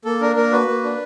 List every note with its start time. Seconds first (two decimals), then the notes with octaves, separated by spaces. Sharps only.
0.05 A#3 A4
0.21 D4 A#4
0.36 A#3 A#4
0.51 F#4 B4
0.68 A#3
0.83 D4